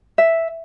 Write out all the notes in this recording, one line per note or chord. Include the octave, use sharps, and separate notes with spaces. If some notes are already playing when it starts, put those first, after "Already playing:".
E5